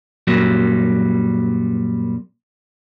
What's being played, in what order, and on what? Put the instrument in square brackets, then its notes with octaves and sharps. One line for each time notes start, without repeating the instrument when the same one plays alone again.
[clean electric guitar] F#2 A#2 F#3 G3